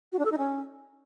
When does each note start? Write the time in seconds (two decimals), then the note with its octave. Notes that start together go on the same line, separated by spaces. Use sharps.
0.12 F#4
0.18 D4
0.25 A4
0.31 D#4
0.38 C#4